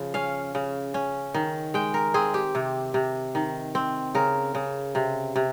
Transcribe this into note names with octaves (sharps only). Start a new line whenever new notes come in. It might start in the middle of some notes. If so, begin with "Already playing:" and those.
Already playing: C#3 F3
C#4 F5
C#3
C#4
D#3
G#3 G5
A#4
C4 G#4
G4
C3
C3
D#3
C4
C#3 A#4
C#3
C3
C3